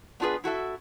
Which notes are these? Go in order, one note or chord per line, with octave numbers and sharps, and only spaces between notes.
B3 D4 F4 F#4 G#4 B4
E4 F#4 A4 E5